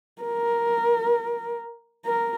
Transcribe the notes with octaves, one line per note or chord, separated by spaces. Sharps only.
A#4
A#4